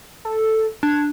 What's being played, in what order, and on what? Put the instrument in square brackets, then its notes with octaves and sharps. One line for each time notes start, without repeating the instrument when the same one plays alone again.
[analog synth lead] A4
[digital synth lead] D4 [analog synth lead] G#6